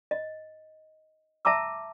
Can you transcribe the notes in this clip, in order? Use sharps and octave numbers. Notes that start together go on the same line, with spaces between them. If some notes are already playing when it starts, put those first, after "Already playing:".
D#5
E5 A5 A#5 D6 E6